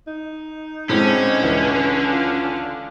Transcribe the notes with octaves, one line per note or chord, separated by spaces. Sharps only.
D#4
A2 D3 G#3 C4 C#4
C#2 E3
F4